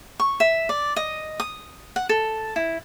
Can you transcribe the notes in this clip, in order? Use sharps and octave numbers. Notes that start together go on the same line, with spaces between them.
C#6
E5
D5
D#5
D#6
F#5
A4
E4